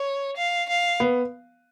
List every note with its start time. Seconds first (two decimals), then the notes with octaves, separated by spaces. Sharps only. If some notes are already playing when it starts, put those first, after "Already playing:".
Already playing: C#5
0.37 F5
0.69 F5
1.00 B3